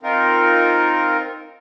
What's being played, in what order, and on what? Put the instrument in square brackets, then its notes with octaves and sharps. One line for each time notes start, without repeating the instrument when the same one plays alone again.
[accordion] C4 D#4 F4 A#4